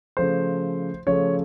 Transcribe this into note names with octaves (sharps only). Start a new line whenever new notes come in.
C#3 F3 A3 C5
C#3 F3 A3 C#5